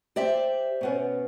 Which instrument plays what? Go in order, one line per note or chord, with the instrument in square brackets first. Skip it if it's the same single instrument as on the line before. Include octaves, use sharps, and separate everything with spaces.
[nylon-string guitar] G4 [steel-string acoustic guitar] C5 D5 E5
[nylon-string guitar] B2 B3 C#4